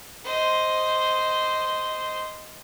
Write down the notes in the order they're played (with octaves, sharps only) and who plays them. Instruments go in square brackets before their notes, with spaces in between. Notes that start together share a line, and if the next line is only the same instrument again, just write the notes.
[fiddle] C5 D#5